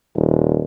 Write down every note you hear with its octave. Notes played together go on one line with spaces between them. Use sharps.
D#1